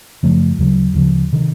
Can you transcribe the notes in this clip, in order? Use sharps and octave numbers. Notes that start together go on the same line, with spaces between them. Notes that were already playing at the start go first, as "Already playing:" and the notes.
F#2 C#3 F3 A3
D2 C#3 F#3
D2 C#3 F3
C3 D#3